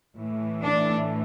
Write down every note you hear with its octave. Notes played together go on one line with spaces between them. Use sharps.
A2 E3 A3
D4